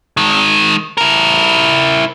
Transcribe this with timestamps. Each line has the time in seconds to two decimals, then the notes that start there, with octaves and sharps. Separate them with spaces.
0.17 D#3 G#3
0.98 E4 A#4